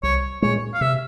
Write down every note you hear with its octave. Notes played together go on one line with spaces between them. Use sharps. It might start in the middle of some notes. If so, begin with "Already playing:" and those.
C2 C#5
A#2 G#3 C#5
F5
C3 E5